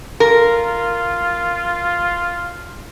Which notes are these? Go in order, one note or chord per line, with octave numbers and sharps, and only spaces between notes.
F4 A#4